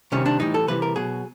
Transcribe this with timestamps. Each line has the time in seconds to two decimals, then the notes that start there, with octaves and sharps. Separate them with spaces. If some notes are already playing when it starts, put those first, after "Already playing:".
0.12 C3 D#3 G3 C#4
0.26 D4
0.40 A2 E3 G3 D#4
0.54 A4
0.68 C3 E3 G3 B4
0.82 A#4
0.96 B2 F#3 G#4